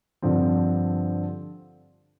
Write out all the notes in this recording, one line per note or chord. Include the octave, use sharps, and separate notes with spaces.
G2 D3 F3 C4